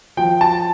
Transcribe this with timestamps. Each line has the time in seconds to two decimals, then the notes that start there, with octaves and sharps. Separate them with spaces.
0.17 F3 G5
0.41 A5